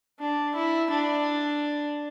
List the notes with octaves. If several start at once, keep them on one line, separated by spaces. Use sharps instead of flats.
D4
E4
D4